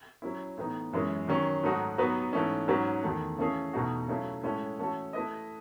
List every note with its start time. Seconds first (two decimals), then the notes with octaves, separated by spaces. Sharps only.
0.22 F#3 C#4 E4
0.57 A2 E3 B3 D#4
0.93 F#2 E3 G#3 C#4 G#4
1.28 D#3 F#3 C#4
1.63 G#2 F#3 A3 D#4 F#4
1.98 F#3 B3 D#4 F#4 B4
2.33 G#2 E3 A3 C#4
2.68 G#2 F#3 C#4 F#4 B4
3.03 E2 D#3 A3
3.38 C#3 E3 A3 C#4 G#4
3.73 E2 B2 A3 D#4 F#4
4.08 C#3 F#3 A3 C#4 E4
4.43 A2 G#3 C#4 E4 A4
4.79 E3 A3 C#4 F#4 A4
5.13 A3 E4 B4 D#5